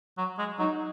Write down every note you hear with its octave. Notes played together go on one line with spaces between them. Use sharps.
F#3
G#3
F#3 D#4